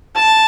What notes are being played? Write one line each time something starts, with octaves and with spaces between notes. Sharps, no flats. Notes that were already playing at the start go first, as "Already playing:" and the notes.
A5